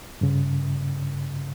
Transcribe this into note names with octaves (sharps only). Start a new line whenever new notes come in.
G2 C#3